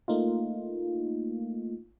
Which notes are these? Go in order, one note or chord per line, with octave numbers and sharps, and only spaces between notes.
A3 A#3 D#4 F4